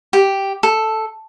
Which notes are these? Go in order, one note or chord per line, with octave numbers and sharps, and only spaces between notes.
G4
A4